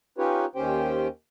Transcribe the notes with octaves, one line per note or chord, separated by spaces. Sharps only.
C#4 D#4 F4 G4 B4 C#5
D#2 D#3 C#4 G4 C5 G5